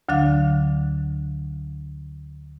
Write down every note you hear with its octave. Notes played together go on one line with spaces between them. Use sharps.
D2 D3 F#3 D4 F5